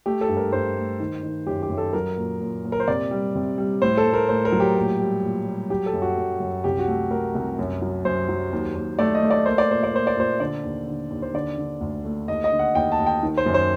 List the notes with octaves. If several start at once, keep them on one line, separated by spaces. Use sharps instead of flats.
A3 G4
A4
G2
A#4
G2 C5
A3
D#3
D#3
F#2 G4
G4
F#2
A4
F#3 A#4
A#2
A#2
A#2
A#4
C5
C3 D5
G3
C3
G3
A2 C5
A4
A2
A#4
A2 C5
A#4
F#3
G4
A#2
G3
A#2
G3
F#3 G4
A4
F#2
F#4
F#2
F#2
C2 G4
F#4
A3
A3 A#4
C2
F#2
F#3
F#2 C5
F#3
D#2
D#2
A3 D5
D#5
A3
D5
A#3 C5
D5
A#2 C5
D5
A#3 C5
D5
A#2 C5
D3 D5
D#2
D3
D#2
C5
D3 D5
D3
D2
A3
D#2 D#5
D#5
D3
F#5
D#2 G5
A5
D#2
G5
D#3
C5
F#2
C5